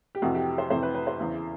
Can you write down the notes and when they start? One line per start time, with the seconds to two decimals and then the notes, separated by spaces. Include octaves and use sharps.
0.15 G4
0.22 F2 C3 E3 F#4
0.35 G4
0.58 C5
0.70 F2 C3 E3 C5
0.83 B4
0.95 B4
1.07 C5
1.19 E2 C#3 E3